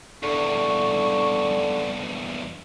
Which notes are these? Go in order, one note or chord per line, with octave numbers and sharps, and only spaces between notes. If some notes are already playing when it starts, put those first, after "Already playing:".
E2 G2 D3 C#6